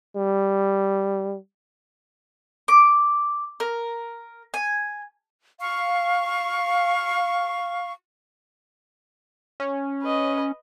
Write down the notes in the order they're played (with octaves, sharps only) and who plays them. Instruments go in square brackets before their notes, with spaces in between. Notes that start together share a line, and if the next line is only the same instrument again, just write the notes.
[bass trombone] G3
[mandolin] D6
A#4
G#5
[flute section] F5 C#6
[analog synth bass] C#4
[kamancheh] B4 D#5